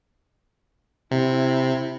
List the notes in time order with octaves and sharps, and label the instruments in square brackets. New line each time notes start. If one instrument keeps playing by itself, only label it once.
[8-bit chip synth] C3 [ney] E4